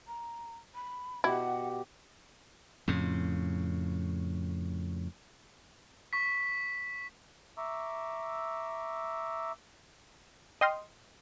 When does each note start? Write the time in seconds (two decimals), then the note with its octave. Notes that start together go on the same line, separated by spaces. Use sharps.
0.07 A#5
0.75 B5
1.24 B2 E4 G4 F#5
2.88 F2 A2 C#3
6.13 C#6 B6
7.58 E5 A#5 C#6 D6 E6
10.61 D#5 G5 C6 D#6 F6